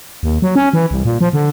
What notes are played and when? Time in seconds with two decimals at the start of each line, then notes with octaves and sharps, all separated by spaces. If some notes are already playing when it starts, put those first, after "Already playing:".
0.23 D#2
0.42 F#3
0.55 C#4
0.73 E3
0.91 C2
1.05 A#2
1.21 F3
1.33 D3